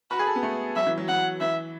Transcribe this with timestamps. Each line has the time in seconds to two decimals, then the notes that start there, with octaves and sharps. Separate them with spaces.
0.11 F#4 B4
0.19 G#4
0.27 A4
0.36 B3
0.43 A3
0.76 F#3 E5
0.87 E3
0.98 F#3
1.08 F#3 F#5
1.41 E3 E5